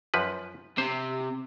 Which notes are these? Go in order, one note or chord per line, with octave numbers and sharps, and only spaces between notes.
F#2 F3 B4
C3 C5